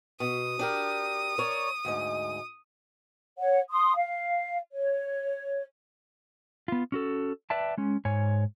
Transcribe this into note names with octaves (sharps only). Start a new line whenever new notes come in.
B2 D#6
D4 G4 A#4
A#4 C#5 D5
D2 G#2 D#5
C#5 F#5
C6 D#6
F5
C#5
B3 F4
C#4 F#4 A4
B4 D5 E5 G5 A5
G#3 C#4
G#2 C#5 G#5